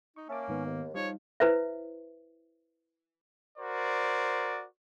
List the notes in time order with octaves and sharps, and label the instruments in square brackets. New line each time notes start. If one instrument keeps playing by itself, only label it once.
[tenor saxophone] D#4 [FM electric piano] C#6
[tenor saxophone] A#3 [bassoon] C#4 [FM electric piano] E5 A5 D6
[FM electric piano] G#2 D#3 B3
[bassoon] D#2
[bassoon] F3 [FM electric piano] G3 D#4 [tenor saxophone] C#5
[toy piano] E4 B4 C5 E5
[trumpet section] F#4 A#4 C5 D5